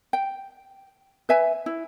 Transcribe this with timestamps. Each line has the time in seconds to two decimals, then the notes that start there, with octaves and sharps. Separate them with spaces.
0.13 G5
1.29 B4 E5 G#5
1.66 E4